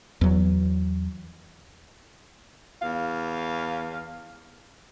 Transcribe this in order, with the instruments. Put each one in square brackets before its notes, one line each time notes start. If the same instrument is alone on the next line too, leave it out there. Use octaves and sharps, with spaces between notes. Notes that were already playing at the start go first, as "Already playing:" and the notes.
[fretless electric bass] E2 F#3
[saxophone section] E2 F5